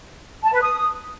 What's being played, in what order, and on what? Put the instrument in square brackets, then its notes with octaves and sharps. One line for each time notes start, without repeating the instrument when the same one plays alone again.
[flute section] A5
B4
D#6